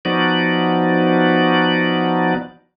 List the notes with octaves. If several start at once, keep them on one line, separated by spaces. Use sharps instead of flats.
F3 B3 D#4 F#4 D5